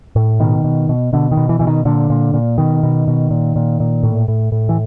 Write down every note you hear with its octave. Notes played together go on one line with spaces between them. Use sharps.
A2
B2 D#3
B2
B2
B2 D3
D#3
B2
E3
B2 E3
D#3
A#2 D3
A#2
A#2
B2 D#3
B2
B2
A#2
A#2
A#2
A2
A2
A2
E3